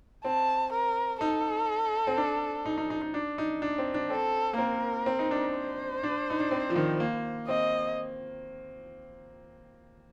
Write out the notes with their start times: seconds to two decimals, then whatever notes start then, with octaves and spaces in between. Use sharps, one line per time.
0.25 C4 A5
0.73 A#4
1.20 D#4 A4
2.07 C4
2.17 D4
2.66 D#4
2.78 D#4
2.90 D#4
3.02 D#4
3.14 D4
3.38 D#4
3.62 D4
3.78 C4
3.94 D4
4.10 C4 A4
4.53 A#3
4.58 C4 A#4
5.06 C4
5.19 D#4
5.31 D4
5.55 C5
6.03 D4
6.30 D#4
6.40 D4
6.51 C4
6.70 F3
6.75 D#3
7.00 A#3
7.48 C4 D#5